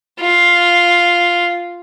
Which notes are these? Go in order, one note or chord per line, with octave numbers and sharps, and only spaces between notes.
F4